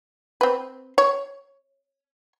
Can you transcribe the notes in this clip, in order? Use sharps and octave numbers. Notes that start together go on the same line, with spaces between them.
C4 B4
C#5